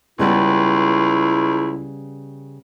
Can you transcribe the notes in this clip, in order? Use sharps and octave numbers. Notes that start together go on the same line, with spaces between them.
C#2 C#3 G3 B3 E4